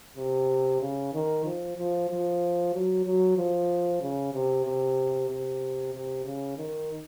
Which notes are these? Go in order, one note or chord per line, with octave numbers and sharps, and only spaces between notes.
C3
C#3
D#3
F3
F3
F3
F#3
F#3
F3
C#3
C3
C3
C3
C3
C#3
D#3